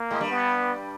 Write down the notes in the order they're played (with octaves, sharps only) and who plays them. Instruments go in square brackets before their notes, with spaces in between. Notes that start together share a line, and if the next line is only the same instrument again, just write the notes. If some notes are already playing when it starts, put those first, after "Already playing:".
Already playing: [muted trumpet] A#3
[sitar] G#2 G#3
G2 G3
[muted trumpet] B3